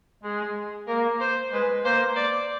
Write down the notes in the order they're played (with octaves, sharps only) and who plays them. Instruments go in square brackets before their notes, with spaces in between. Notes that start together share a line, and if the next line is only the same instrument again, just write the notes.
[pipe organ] G#3 [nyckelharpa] G#4
[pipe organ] A#3 [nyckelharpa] A#4
[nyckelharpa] C5
[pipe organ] G#3 [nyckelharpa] B4
[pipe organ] A#3 [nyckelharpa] C5
[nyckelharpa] D5